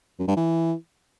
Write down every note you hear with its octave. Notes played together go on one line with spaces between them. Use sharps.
F#2
G2
E3